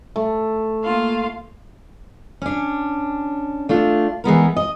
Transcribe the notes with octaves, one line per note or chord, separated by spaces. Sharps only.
A3
A#3 F4 F5
C#4 D4
A3 D4 F4
E3 G#3 B3 A#4
D#5